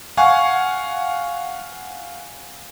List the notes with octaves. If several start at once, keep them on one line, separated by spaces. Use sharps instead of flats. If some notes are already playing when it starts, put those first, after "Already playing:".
F5 F#5 G#5 C#6